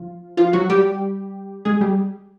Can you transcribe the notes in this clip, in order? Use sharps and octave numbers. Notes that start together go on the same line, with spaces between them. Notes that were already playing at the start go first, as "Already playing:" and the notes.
Already playing: F3 F4
F3 F4
F#3 F#4
G3 G4
G#3 G#4
G3 G4